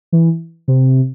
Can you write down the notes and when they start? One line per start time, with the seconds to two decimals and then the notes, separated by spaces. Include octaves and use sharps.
0.12 E3
0.68 C3